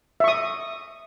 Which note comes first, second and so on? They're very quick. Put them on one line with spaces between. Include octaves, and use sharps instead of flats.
E5 C#6 D#6